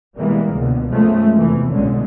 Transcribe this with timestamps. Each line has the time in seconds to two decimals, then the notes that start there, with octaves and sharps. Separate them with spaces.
0.18 B2 E3 G3 G#3 A#3
0.54 C#2 B2 D3
0.93 F#2 F3 G#3 A3
1.38 E2 C3 E3
1.72 B1 G2 A#2 D3 G#3 C#4